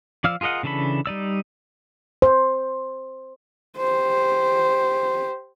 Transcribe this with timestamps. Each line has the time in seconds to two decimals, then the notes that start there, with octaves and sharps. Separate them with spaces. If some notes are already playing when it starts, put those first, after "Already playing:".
0.24 F3 D5 F5 E6 F6
0.41 F4 G#4 A#4 D#5 F#5
0.63 C#3 E3 D4 A4 B5
1.06 G3 D#4 D5 E6
2.22 C5
3.77 G4 C5